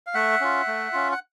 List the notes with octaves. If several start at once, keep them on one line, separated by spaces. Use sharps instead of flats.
F5
A3 E5 F#5
C#4 F4
A3
C#4 F4
F#5